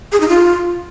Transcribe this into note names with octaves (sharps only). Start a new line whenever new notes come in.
G#4
D#4
F4